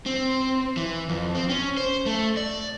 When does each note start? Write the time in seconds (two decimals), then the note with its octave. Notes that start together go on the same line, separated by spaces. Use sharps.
0.06 C4
0.77 E3
1.09 F2
1.35 C4
1.50 C#4
1.77 C5
2.06 A3
2.37 D5